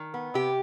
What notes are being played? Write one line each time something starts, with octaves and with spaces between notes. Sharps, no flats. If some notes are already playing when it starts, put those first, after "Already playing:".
Already playing: D#3
B3
C3 G4